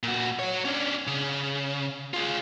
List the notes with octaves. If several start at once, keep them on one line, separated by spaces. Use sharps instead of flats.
A#2 F#4
F#4 C#5
C#4 D4
C#3
F4 G#4